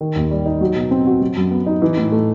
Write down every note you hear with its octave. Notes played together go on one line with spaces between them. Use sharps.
D#3
D#2
G3
D#4
F#3
B2
C4
F#4
F#3
F#2
B3
D#4
E3
A2
A3